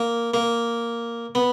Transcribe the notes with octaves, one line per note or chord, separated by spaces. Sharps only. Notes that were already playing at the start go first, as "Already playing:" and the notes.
Already playing: A#3
A#3
B3